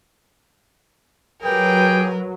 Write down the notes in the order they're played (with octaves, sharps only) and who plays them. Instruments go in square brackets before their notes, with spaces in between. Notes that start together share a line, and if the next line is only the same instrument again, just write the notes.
[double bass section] F#3 [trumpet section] G4 G#4 G5 [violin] A#4 B4